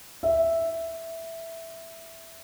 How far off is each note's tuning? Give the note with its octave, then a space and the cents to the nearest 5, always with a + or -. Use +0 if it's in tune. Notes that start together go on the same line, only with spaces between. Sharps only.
E5 +0